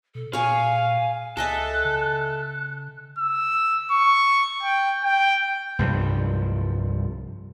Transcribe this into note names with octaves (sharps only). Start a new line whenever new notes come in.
B2 A4
A#2 G#4 C#5 F5 G#5
C#2 G#4 A4 D#5 E5 F#6
C#3
E6
C#6
G5
G5
C2 G2 F3